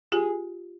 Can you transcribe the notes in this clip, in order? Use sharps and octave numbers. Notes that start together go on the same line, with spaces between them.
F4 G4 G#4